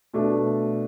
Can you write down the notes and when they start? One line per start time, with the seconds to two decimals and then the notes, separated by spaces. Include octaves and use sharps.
0.14 B2 A3 D4